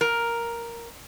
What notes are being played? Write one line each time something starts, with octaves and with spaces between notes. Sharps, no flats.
A#4